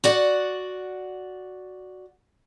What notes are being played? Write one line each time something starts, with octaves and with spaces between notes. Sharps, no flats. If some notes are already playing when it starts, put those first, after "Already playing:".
F#4 D5 F#5